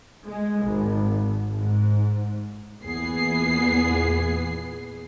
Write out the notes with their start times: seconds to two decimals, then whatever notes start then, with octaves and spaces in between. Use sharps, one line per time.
0.25 G#3
0.65 G#1
1.55 G#2
2.83 E2 A#2 E3 B3 G#4 C7